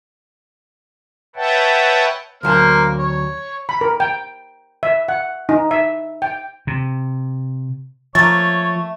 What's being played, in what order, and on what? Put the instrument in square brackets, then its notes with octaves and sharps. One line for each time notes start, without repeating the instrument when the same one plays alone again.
[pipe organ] B4 C#5 E5 F#5 G5 A5
[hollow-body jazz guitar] D2 F#3 A5 [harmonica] A#3 C5 F6
[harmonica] C#5
[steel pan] B5
A#4
G5
E5
F#5
D#4
E5
G5
[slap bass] C3
[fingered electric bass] F3 [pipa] A3 A#3 [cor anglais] C#5 [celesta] A6